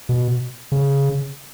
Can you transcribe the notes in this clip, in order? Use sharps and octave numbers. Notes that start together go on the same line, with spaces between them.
B2
C#3